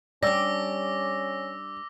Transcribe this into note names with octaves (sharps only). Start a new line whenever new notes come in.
G3 C#4 D4 D5 D6 E6 A#6